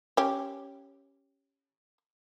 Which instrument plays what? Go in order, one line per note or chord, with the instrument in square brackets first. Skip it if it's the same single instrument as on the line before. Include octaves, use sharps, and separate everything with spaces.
[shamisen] C#4 G4